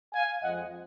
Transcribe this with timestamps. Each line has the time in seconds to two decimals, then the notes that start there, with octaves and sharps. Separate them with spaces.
0.14 F5 G#5
0.42 F2 F3 G#3 D#5 F#5